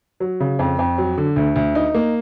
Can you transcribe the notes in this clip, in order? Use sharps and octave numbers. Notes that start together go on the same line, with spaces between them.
F#3
C#3
F2
F2
F#3
D3
D2
D2
D#4
A#3